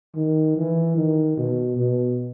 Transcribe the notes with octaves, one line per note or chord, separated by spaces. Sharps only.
D#3
E3
D#3
B2
B2